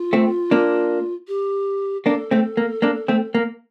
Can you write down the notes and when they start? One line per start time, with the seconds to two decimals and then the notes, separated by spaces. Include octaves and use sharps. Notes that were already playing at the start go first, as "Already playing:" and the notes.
Already playing: F4
0.13 A3 C4
0.51 A#3 D4
1.28 G4
2.06 A#3 D4 A4
2.31 A3 C4
2.57 A#3
2.82 A#3 D4
3.08 A3 C4
3.35 A#3